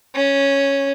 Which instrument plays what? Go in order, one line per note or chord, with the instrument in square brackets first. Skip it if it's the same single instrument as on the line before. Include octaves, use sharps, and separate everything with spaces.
[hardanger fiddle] C#4